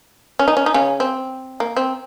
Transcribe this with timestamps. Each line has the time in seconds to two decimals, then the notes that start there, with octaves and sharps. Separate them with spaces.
0.39 C#4
0.48 D#4
0.57 C#4
0.66 D#4
0.74 C#3 C#4
1.00 C4
1.60 A#3
1.77 C4